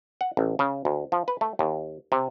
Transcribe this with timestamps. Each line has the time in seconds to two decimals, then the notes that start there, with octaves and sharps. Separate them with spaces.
0.21 F#5
0.37 A1
0.59 C#3
0.85 D2
1.12 F3
1.28 B4
1.41 A3
1.59 D#2
2.12 C3